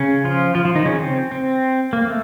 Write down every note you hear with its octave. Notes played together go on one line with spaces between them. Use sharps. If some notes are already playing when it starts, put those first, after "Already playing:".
Already playing: C#3 C#4
F3 F4
F3 F4
F3 F4
D#3 D#4
C#3 C#4
C4
C4
A#3
A3